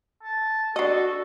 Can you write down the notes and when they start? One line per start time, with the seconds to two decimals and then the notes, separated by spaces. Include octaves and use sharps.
0.23 A5
0.76 D4 F#4 A4 D#5